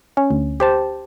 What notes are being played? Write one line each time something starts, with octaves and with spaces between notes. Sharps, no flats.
C#4
D2
G4 C5 A5